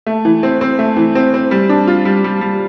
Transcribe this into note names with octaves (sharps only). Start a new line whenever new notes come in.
A3
E3
C4
C4
A3
E3
C4
C4
G3
D4
F4
G3
G3
G3